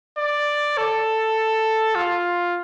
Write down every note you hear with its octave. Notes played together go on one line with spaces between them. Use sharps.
D5
A4
F4